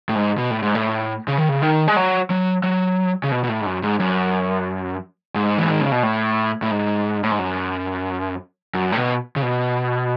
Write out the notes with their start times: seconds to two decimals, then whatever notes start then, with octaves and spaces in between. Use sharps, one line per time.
0.09 A2
0.15 G#2
0.38 B2
0.51 A2
0.62 G#2
0.75 A2
1.28 C#3
1.38 D#3
1.49 C#3
1.62 D#3
1.88 G#3
1.96 F#3
2.30 F#3
2.63 F#3
3.24 C#3
3.32 B2
3.44 B2
3.49 A2
3.61 G#2
3.66 F#2
3.83 G#2
4.00 F#2
5.36 G#2
5.58 E3
5.70 D#3
5.81 C#3
5.92 B2
6.03 A2
6.62 A2
6.71 G#2
7.23 A2
7.31 G#2
7.39 F#2
8.74 F#2
8.92 A2
8.97 B2
9.36 C#3
9.42 B2